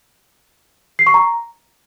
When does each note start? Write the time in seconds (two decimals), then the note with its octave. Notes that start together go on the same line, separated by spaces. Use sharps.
0.99 C7
1.07 C#6
1.14 A#5